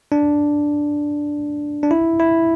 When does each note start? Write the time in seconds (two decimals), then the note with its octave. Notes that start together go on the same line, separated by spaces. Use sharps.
0.12 D4
1.83 D4
1.91 E4
2.20 E4